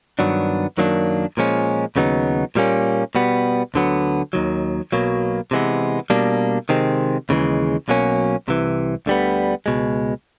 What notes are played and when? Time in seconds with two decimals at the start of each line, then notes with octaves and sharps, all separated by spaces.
0.19 G2 D#3 F#3 B3 D4
0.77 F#2 D#3 F#3 A#3 D4
1.37 A#2 F3 G#3 C#4
1.96 D#2 C#3 F#3 B3 D#4
2.55 A#2 G3 A#3 C#4
3.15 B2 G3 B3
3.74 D2 D3 F#3 B3
4.33 D#2 D#3 F#3
4.92 B1 B2 F#3 A#3
5.51 C3 E3 G#3 B3
6.10 B2 G3 A#3 D4
6.69 C3 D#3 G#3 C4
7.29 D#2 C#3 E3 G#3
7.88 B1 B2 F#3 A#3 C#4
8.48 C2 C3 E3
9.06 D2 D3 G3 B3
9.66 C#2 B2 G#3